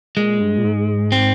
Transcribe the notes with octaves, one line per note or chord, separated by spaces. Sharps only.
A#2 G#3
G2
A#2
G#2
C4